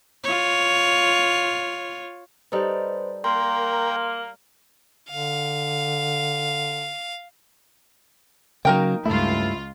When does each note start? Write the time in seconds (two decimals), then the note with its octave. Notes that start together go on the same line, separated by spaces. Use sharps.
0.24 F4 C#5
2.52 G3 D#4 A4 B4 C5
3.24 A#3 A#4 G5 C6
5.10 D3 F5
8.65 C#3 F#3 A#3 D#4 A#4 G5
9.06 C#2 G2 A3 E4 F4